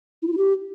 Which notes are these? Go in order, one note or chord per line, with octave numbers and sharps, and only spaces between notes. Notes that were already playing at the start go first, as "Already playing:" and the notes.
E4
F4
E4
G4